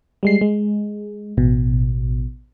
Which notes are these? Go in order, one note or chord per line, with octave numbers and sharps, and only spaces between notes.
G3 G#3 C7
G#3
A1 B2